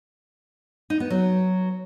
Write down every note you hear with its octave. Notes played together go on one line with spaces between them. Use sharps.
D#4
B3
F#3